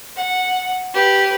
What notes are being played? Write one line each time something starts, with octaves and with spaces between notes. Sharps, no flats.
F#5
G4 B4